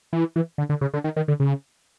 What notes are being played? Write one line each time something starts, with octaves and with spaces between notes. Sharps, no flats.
E3
E3
D3
D3
C#3
D3
D#3
D#3
D3
C#3